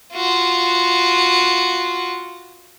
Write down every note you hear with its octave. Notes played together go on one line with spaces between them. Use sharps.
F4 F#4